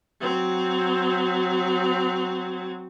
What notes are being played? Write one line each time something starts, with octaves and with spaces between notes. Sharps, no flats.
F#3 C4